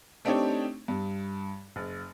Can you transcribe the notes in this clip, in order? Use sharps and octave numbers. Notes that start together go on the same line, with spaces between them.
A3 C4 D4 D#4 G4 C#5
G2
F#1